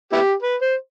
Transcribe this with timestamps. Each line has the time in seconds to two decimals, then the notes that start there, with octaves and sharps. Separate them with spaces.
0.13 B3 E4 G4
0.42 B4
0.62 C5